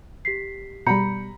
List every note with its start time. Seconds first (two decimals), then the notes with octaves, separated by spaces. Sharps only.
0.25 G4 B6 C7
0.87 B2 G3 A#5 B5 G6 C#7